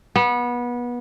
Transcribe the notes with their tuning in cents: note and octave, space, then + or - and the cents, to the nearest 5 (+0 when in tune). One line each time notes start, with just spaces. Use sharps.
B3 -25